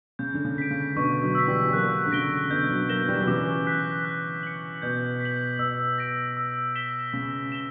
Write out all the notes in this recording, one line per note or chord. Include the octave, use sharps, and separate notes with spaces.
C#3 G6
D3
C#3
B6 D7
C#3
B2 D3 C#6
D3 F#3
E6 B6
E3 G3
G3
F#3 A#3 F#6
D3
C#3 A#6 D7 G7
B2 D3 G6
D3 F#3
F#3 A#3 A#6 E7 G7
E3 G3
F#3
C#3 E3 D6
F#6 B6
F#6
C#7 F#7
B2 G6
B6
F#7
B2 E6
A#6 D7
E6
B6 E7 G7
C#3 A#6
E7 G7